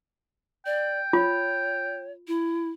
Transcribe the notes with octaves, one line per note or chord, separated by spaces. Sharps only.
D5 G5
F4 C#5
E4